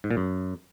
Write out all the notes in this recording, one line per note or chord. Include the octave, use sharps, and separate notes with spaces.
G#2
A#2
F#2